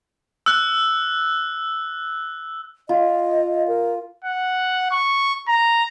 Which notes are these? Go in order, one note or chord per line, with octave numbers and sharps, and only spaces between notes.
E6 F#6
F4 D#5
A#4
F#5
C#6
A#5